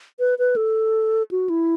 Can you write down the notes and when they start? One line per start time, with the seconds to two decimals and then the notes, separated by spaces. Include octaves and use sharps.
0.19 B4
0.39 B4
0.56 A4
1.31 F#4
1.49 E4